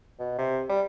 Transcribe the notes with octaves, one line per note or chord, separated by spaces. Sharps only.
B2
C3
G3